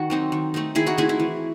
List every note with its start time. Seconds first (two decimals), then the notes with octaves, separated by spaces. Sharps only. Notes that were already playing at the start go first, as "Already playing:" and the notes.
Already playing: D#3 F#4
0.10 F#3 C4 D#4
0.32 D#3
0.54 A3 C4 D#4
0.75 D#3 E4 G#4
0.86 D#4 F#4
0.98 A3 C4 D#4 E4 G#4
1.09 E4
1.20 E3